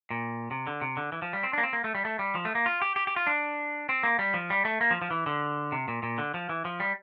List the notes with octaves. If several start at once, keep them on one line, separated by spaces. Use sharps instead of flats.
A#2
C3
D3
C3
D3
E3
F3
G3
C4
A#3 D4
C4
A#3
A3
G3
A3
G3
F3
A3
A#3
F4
G4
G4
G4
F4
D4
C4
A#3
G3
F3
G3
A3
A#3
F3
F3
E3
D3
C3
A#2
A#2
D3
F3
E3
F3
G3